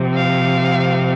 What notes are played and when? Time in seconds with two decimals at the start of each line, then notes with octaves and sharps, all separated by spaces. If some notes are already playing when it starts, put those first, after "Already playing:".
Already playing: C3 F3 C4
0.13 F5